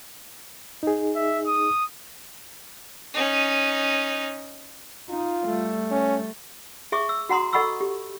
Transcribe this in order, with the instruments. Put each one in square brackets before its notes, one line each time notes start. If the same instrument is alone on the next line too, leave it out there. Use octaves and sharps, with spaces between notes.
[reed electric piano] D#4 G#4
[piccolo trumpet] E5
D#6
[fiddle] C#4 D#4
[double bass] D#4 [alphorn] F4
[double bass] G3 A3
[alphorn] C#4
[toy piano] G#4 E5 C#6 D6
E6
F#4 F#5 A#5 C6 D#6
A4 D#5 F#5 B5 C#6 E6
G4